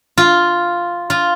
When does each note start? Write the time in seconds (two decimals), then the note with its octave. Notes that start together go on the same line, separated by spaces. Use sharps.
0.18 F4
1.10 F4